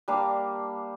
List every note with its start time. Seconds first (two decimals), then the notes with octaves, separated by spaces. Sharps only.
0.08 G3 A#3 D4 F5